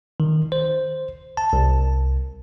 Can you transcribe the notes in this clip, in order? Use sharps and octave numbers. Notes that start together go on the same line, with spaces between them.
D#3
C5
A5
C2